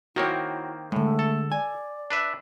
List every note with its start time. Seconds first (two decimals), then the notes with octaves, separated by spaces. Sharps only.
0.16 D#3 A#3 C4 E4 F#4 C#5
0.92 A2 D3 G#3 A3
1.19 A4
1.52 D5 G#5
2.10 D4 B4 E5